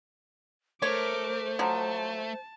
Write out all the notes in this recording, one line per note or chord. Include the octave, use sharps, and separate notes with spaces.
A3 A#4 C5 C#5 D6
F3 F#3 A5